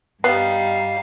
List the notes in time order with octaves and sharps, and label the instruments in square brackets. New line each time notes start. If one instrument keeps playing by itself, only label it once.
[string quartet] G2 G3 D#4 [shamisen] B3 [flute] F5 [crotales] C7